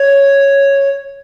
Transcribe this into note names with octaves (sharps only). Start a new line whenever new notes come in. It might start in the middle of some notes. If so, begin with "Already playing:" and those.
Already playing: C#5